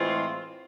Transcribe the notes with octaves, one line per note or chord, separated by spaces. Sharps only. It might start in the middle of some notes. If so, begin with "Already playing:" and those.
Already playing: A2 E3 G#3 C4 F4